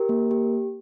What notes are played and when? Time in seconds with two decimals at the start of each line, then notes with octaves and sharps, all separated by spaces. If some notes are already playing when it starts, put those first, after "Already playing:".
Already playing: G4 A#4
0.09 A#3
0.31 G4